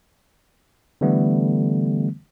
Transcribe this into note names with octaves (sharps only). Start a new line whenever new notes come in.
D3 E3 G3 A3 B3